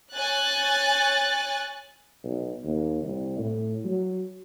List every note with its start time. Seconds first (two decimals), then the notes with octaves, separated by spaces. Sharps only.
0.13 C#5 G#5 F#6 A6
2.24 B1
2.64 D#2
3.03 C2
3.38 A2
3.85 F#3